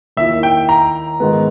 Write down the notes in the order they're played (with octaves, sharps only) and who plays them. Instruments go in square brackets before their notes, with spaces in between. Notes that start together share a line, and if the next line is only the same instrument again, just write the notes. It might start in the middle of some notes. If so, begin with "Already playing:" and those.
[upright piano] D#2 D#3 A#3 E4 [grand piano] E5
[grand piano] G5
A#5
[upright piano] G#2 D#3 G#3 B3